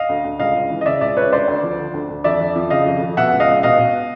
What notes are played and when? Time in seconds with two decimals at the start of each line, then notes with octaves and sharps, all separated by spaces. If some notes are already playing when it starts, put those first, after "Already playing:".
Already playing: D#5 F5
0.09 D2
0.24 D2
0.39 C#2 D#5 F5
0.55 C#2
0.70 E3
0.81 D#5
0.86 C#3 D5 E5
1.01 C#2 D5 E5
1.17 C#2 B4 C#5
1.32 D2 C5 D5
1.48 D2
1.63 F3
1.79 D3
1.94 D2
2.09 D2
2.24 F2 D5 E5
2.40 F2
2.56 F3
2.70 C#3 D#5 F5
2.86 F2
3.02 F2
3.17 B2 E5 F#5
3.33 C#2
3.40 D#5 F5
3.48 C#2
3.63 B2 D#5 F5
3.78 B2